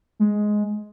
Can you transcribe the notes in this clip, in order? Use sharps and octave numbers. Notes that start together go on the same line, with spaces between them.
G#3